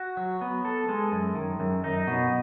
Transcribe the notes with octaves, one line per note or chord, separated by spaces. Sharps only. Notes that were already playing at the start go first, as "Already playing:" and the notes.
Already playing: F#4
F#3
B3
A4
G#3
F#2
D#3
F#2
D#4
B2